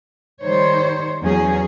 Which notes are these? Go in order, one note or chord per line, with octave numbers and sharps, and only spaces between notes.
D#3 G3 C5 C#5
E2 E3 F#3 C#4 G#4